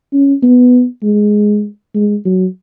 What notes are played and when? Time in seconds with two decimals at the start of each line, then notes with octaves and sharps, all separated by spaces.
0.13 C#4
0.43 B3
1.03 G#3
1.95 G#3
2.25 F#3